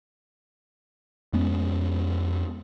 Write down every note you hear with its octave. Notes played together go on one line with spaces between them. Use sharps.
F2 G#3 B3 C#4